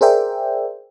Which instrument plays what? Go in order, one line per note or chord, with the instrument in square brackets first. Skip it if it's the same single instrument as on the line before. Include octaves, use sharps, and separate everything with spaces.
[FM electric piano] G#4 A#4 C5 D5 E5 G5